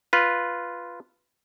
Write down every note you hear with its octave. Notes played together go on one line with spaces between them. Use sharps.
F4 B4